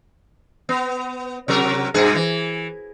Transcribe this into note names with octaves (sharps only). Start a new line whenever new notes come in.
B3
C3 F#3 A#4
G2 B2 G#4
E3